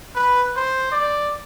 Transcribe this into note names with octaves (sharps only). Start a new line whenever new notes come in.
B4
C5
D5